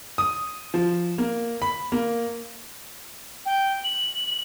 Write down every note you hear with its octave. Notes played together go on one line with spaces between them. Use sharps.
D#6
F3
A#3
B5
A#3
G5
F#7